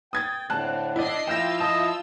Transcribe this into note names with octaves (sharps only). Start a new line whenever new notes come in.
G5 D#6 G#6 A6
A2 D3 C4 A5 F#6
D4 E4 D5 D#5 C7
F3 E4 F4 E5 G5 E6 G6 A#6
D#5 A5